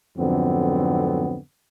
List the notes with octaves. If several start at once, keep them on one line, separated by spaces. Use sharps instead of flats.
F2 G#2 D3 F#3 B3 C4